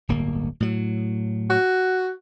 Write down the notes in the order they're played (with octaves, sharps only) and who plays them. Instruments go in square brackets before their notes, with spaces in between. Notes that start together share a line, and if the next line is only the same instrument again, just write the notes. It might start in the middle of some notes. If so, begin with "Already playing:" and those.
[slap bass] D1 G1 A#3
A2 F#3
[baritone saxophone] F#4